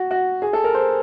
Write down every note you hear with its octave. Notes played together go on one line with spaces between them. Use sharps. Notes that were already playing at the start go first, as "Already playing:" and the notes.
Already playing: F#4
F#4
G#4
A4
A#4
C5